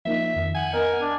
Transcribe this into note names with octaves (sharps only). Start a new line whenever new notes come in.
F3 A#3 D#4 E5
F2 D#3
F#5 G#5
B3 A#4 D#5
D4